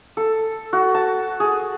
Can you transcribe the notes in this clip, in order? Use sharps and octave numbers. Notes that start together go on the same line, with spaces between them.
A4
F#4
A5
G#4